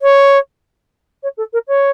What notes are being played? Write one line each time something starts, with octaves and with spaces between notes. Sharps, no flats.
C#5
C#5
A4
A#4
C#5